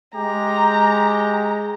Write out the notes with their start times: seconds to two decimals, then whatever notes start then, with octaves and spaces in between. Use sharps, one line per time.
0.16 G#3 G4 A#5